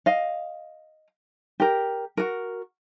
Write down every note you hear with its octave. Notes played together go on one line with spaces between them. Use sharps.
D#5 F5
G4 A#4
F#4 A#4